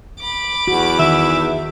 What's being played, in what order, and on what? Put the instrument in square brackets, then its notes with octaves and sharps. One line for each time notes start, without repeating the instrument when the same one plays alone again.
[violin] B5 D6
[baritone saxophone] E2 [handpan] F#4
[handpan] D#3 [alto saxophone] E5